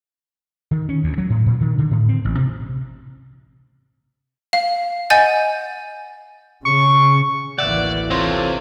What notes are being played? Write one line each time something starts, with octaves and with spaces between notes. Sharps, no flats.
D#3
C#4
D2
F#3
A2
A#2
D#3
D3
A2
C4
A1
C3
F5
D#5 F#5 G#5 G6 A6
C#3 C#6
A1 D2 E3 A#3 D5 E5 F#5
C3 C4 F4 A4 C5 C#5